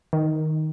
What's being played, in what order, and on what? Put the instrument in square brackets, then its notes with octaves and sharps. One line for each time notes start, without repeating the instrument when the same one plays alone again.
[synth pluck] D#3